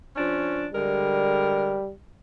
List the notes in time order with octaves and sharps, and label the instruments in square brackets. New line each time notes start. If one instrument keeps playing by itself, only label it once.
[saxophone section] F3 C#4 D4
[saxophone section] D3 G#3 A#4 [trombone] G3